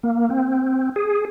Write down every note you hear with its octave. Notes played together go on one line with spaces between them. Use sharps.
A#3
C4
G#4